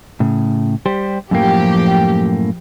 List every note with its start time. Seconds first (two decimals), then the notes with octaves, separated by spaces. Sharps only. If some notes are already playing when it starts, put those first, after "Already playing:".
0.20 A2 C#3
0.86 G3 G4 C5
1.31 F#2 A2 F3 A#3 G4